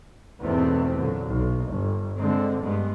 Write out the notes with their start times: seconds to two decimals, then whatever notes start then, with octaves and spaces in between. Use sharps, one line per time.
0.40 E2 G#2 B2 A3 B3 C4
0.94 A#2 D3 F#3
1.27 B1
1.69 G1
2.18 D3 G#3 C4
2.61 G2 G#3 B3